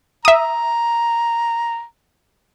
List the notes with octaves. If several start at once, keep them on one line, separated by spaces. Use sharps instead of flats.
E5 A#5 D#6